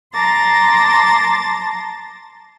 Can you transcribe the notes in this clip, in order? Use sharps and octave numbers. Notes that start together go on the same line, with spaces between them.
A5 A#5 C6 D6 A6 A#6